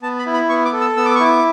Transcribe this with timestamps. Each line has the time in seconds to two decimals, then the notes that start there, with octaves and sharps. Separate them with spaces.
0.02 B3 A5
0.19 B5
0.26 E4
0.34 B5
0.49 B3 C#6
0.65 D6
0.73 A4
0.81 E6
0.97 B3 E6
1.06 D6
1.15 C#6
1.20 E4 D6